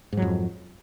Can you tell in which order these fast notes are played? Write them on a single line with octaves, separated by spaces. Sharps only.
G#2 F#3 F2